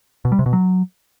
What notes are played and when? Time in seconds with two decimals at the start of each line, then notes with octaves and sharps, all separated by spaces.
0.25 B2
0.32 G3
0.39 C3
0.46 B2
0.53 F#3